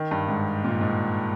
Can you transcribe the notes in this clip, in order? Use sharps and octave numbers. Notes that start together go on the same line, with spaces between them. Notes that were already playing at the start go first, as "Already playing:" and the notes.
Already playing: D#3
G2
G#2
A#2
G#2